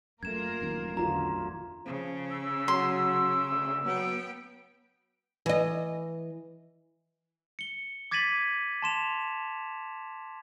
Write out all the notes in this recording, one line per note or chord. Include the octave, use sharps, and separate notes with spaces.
F#2 A3 A#3 F4 A#4 G#6 E7
A1 F#2 D#3
E2 D3 F4 F#4 A#5
C#3 F3
E6
F#3 C6
D2
F#3 B3 G5
E3 D#5
C#7 G7
D6 G#6 A6 B6 D#7 F#7
A5 C6 E7 F7